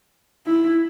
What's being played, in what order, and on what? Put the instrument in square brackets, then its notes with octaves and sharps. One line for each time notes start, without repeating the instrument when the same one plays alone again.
[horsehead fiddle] E4